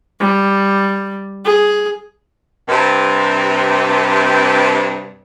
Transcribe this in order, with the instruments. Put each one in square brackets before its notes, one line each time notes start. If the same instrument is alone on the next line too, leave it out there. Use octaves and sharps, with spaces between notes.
[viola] G3
G#4
[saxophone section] G2 C3